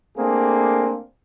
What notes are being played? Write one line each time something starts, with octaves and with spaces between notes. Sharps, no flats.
A3 A#3 C4 D4 G#4